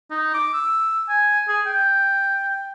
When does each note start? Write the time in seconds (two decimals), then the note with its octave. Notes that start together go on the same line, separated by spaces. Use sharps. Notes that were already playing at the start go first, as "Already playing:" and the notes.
0.11 D#4
0.34 D6
0.54 E6
1.09 G#5
1.48 G#4
1.66 G5